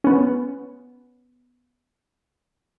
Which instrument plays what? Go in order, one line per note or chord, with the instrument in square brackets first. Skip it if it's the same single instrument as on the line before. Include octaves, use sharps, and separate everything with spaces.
[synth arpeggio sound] B3 C#4